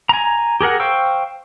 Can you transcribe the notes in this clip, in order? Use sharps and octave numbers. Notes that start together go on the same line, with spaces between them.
G#5 A#5
G4 G#4 A#4 F#5
C5 F5 G5 C#6 E6